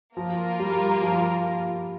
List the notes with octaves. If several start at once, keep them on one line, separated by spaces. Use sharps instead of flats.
F3 A#3 F4 A#4
G3
F3